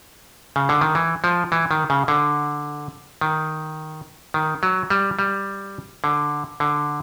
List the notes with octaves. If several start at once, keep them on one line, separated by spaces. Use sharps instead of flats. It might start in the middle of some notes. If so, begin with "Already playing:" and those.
C#3
D3
D#3
E3
F3
E3
D#3
C#3
D3
D#3
D#3
F#3
G3
G3
D3
D3